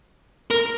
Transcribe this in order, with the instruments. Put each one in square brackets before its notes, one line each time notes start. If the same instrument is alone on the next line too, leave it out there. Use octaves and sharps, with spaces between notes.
[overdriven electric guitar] A#4